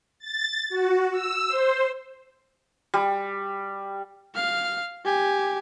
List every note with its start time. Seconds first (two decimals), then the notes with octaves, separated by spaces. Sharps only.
0.19 A6
0.69 F#4
1.11 E6
1.48 C5
2.94 G3
4.35 F5 F6
5.05 G4 G#5